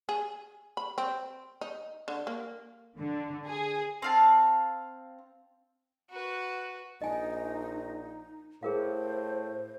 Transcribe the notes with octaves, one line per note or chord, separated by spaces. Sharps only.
G#4
B5
C4
D#4
D3
A#3
D3
G#4
C4 F5 A5
F#4 B4
A#1 D#4 D#5 G#5
A2 G#4 A#4 C5 F5